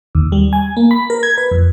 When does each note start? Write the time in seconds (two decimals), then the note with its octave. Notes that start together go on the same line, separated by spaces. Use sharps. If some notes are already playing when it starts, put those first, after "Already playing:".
0.15 D#2
0.32 G3
0.53 G#5
0.77 A#3
0.91 B5
1.10 A#4
1.23 G#6
1.38 B4
1.51 F2